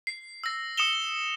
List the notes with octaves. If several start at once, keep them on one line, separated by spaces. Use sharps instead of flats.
C7
E6 A#6
D#6 C#7 E7 F7 G7